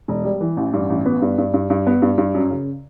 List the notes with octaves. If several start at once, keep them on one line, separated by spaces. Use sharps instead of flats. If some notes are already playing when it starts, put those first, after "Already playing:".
E1
G3
E3
A1
G2
A1
B3
G2
G2
G2
G2
B3
G2
G2
F#2
C#3